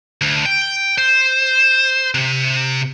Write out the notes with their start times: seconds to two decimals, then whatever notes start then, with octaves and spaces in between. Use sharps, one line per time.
0.21 D2
0.46 G5
0.98 C5
2.14 C3